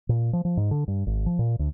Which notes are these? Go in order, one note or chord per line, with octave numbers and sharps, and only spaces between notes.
A#2
F3
F3
G#2
D3
G2
G#1
F3
A#2
D2